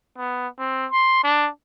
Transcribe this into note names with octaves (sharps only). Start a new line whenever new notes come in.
B3
C4
C6
D4